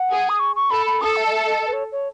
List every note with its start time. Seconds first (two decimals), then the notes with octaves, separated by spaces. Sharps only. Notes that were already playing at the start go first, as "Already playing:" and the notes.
Already playing: F#5
0.10 G#4
0.29 D#6
0.40 C#6
0.56 C#6
0.71 A4 B5
0.86 B5
1.01 A4 D#6
1.16 E5
1.26 D#5
1.32 E5
1.47 D#5
1.62 D#5
1.67 B4
1.73 C#5
1.92 C#5